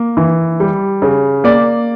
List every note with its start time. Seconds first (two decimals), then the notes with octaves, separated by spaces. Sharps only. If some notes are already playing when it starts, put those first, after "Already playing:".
Already playing: A#3
0.17 E3
0.60 G3
1.02 C#3
1.44 A#3 D5